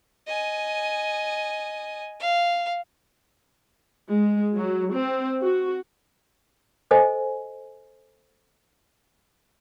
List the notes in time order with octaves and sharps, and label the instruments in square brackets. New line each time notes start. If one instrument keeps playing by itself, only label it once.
[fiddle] D#5 G#5
F5
[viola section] G#3
F#3
C4
F#4
[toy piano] A4 C5 D#5 G#5